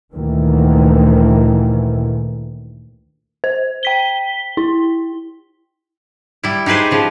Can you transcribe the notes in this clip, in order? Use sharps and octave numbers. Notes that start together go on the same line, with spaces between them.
D2 A#2 D#3 E3
C5
G5 B6 G7
E4
G3 E4
D#4 G4 G#4 B4 C5
C#3 F3